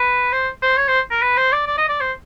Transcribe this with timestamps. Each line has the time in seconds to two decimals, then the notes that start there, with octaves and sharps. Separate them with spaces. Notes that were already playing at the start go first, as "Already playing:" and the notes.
Already playing: B4
0.32 C5
0.62 C5
0.77 C#5
0.88 C5
1.11 A#4
1.22 B4
1.37 C5
1.52 D5
1.67 D5
1.78 D#5
1.89 D5
2.00 C5